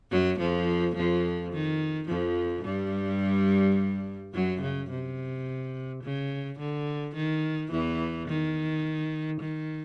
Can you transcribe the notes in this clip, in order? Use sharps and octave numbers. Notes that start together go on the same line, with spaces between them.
F#2 F#3
F2 F3
F2 F3
D#3
F2 F3
G2 G3
F#2 F#3
C#3
C3
C#3
D3
D#3
E2 E3
D#3
D#3